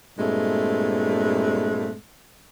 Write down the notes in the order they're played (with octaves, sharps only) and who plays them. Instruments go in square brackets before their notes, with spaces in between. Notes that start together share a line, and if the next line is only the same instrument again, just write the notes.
[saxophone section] G2 A#2 G#3 A3 C4